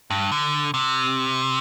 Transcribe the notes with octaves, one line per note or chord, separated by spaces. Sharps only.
G2
D3
C3